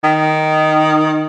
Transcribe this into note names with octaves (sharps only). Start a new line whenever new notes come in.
D#3